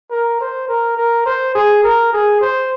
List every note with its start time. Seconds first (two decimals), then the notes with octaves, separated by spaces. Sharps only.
0.11 A#4
0.41 C5
0.68 A#4
0.97 A#4
1.26 C5
1.55 G#4
1.84 A#4
2.13 G#4
2.41 C5